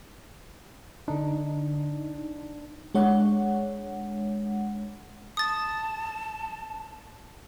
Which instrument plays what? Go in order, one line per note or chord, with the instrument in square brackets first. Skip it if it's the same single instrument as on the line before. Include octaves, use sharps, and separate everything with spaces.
[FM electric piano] D3 D#4 [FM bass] D4
[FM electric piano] G#3 D4 C#5 F#5
[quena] A5 [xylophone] D#6 A6